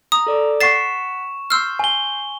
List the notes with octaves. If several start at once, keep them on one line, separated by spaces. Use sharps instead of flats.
A#5 D#6
A4 D5 D6
F#5 C#6 A6 B6 C7 E7
C6 E6 F6 G6 C7
G#5 G7